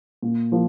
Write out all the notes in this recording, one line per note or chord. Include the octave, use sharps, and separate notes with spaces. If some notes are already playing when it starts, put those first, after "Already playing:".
A#2
F3 A#3